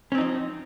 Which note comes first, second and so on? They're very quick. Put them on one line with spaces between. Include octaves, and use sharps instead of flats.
C#4 C4 D#4 F3